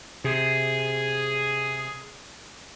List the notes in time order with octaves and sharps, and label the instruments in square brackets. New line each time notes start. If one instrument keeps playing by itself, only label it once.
[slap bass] C3 [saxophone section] G#4